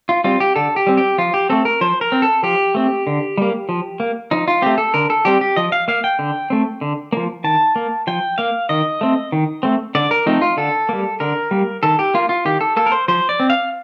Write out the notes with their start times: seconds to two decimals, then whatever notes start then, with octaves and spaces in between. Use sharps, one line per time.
0.09 F4
0.24 G3 C4 F4
0.40 G4
0.56 D3 A4
0.76 G4
0.87 G3 C4
0.97 G4
1.18 F3 F4
1.34 G4
1.50 A3 C4 A4
1.65 A#4
1.81 F3 C5
2.01 A#4
2.12 C4
2.22 A4
2.43 F3 G4
2.75 A3 C4
3.07 D3
3.38 G3 A#3
3.69 F3
4.00 A#3
4.31 F3 D#4
4.48 F4
4.62 A3 C4 G4
4.78 A4
4.94 D3 A#4
5.10 A4
5.25 G3 C4 G4
5.41 G4
5.56 F3 D#5
5.72 F5
5.88 A#3 F5
6.04 G5
6.19 D3
6.50 A3 C4
6.81 D3
7.13 F3 A#3
7.44 D#3 A5
7.76 A#3
8.07 F3 G5
8.38 A#3 F5
8.69 D#3 D#5
9.01 A3 C4
9.32 D#3
9.63 A3 C4
9.95 D3 D5
10.11 A#4
10.26 F3 A3 C4 D#4
10.42 F4
10.57 D3 A4
10.89 G3 A#3
11.20 D3 A#4
11.51 G3 A#3
11.83 D#3 A4
11.99 G4
12.14 A#3 F4
12.29 F4
12.45 D#3 G4
12.61 A4
12.77 A#3 A4
12.86 A#4
12.92 C5
13.08 F3 C5
13.29 D5
13.40 C4
13.50 F5